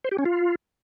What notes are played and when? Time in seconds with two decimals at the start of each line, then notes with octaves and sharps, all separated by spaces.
0.04 C5
0.11 G4
0.18 C#4
0.25 F4